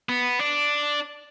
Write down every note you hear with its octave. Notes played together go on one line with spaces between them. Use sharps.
B3
D4